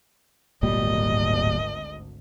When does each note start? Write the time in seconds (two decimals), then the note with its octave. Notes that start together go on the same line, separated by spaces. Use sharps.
0.63 D1 G#1 D2 A#2 G3 D#5